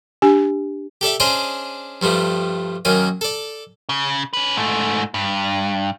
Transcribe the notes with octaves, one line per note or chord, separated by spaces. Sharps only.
D4 G4 G#5
G4 A4 D5 E5
C#4 D4 G#4 C5 D5 D#5
G2 F3 G3 A3
F#2 D#3 A#3 C#4 D#5
A4 D5
C#3
C#4 B4
G#2 A3
G2